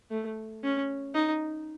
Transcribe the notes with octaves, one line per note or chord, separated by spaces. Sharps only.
A3
C#4
D#4